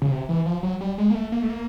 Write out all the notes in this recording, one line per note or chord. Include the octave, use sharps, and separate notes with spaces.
C#3
C3
E3
F3
F#3
G3
G#3
A#3
A3
A#3
A3
A#3